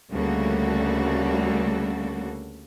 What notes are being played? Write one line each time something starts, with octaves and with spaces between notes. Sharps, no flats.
D2 C#3 G3 A#3 F#4 A4